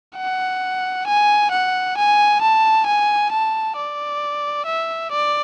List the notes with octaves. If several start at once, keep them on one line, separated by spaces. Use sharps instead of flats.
F#5
G#5
F#5
G#5
A5
G#5
A5
D5
E5
D5